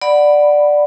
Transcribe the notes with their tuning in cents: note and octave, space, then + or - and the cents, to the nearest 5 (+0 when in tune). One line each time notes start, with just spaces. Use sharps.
D5 +5 F#5 +0 B5 +0